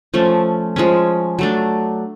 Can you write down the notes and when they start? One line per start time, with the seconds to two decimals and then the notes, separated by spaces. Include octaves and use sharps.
0.14 F3 A3 C#4
0.76 F3 G#3 C#4
1.39 F#3 A3 D4